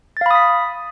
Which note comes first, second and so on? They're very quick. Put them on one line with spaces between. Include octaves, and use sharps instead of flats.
A6 F5 B5 D#6 B6